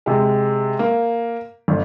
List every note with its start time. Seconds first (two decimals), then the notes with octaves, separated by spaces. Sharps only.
0.06 C3 G#3
0.79 A#3
1.68 G1